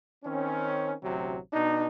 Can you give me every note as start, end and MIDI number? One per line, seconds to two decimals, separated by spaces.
0.24 0.93 51
0.24 0.93 60
0.24 0.93 61
1.03 1.38 33
1.03 1.38 38
1.03 1.38 48
1.03 1.38 54
1.53 1.87 47
1.53 1.87 62
1.53 1.87 63